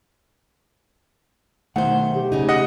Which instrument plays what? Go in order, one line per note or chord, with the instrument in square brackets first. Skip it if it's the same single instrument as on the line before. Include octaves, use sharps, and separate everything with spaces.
[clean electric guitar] B1 A3 F#5 [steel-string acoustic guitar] D#3 C5
[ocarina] G4
[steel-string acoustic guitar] C#3 D#4
[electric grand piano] D#5 F#5